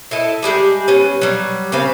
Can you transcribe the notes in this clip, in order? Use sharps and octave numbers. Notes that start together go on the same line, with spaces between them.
E4 A4 D#5
G3 G#3 G4 G#4
B3 C#4
F#3 G3
C#3 C4 B4 F5